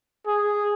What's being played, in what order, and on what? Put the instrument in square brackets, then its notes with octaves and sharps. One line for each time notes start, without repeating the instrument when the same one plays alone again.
[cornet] G#4